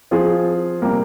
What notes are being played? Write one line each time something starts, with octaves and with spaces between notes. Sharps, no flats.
F3 C4 F4 G#4
C3 G3 A#3